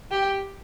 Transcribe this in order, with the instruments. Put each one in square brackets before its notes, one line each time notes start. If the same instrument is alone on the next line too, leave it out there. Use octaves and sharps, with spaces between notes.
[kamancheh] G4